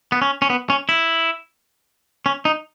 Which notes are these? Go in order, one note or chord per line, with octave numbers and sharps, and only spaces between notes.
B3
C#4
C#4
B3
C#4
E4
C#4
D#4